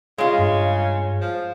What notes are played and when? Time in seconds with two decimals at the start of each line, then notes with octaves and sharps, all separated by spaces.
0.18 C#3 G#3 F4
0.39 G2
1.21 F3